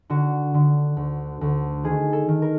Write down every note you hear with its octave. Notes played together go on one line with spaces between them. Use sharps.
D3 F#4
D3
D2
D2
D#3 G#4
A4
D#3
A#4